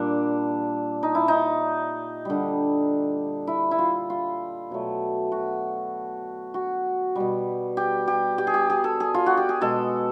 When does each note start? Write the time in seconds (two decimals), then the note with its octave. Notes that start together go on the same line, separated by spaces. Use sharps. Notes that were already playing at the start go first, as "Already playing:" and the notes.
Already playing: A#2 G3 D4
1.03 D#4
1.15 E4
1.28 D#4
2.25 D3 G3
3.47 E4
3.71 E4
3.79 F4
4.10 F4
4.70 B2 F#3 A3
5.32 F#4
6.54 F#4
7.16 B2 G3
7.77 G4
8.08 G4
8.38 G4
8.47 G#4
8.54 G4
8.70 G#4
8.84 A4
9.00 G#4
9.14 F4
9.26 F#4
9.37 G4
9.49 G#4
9.61 B2 G#3 A4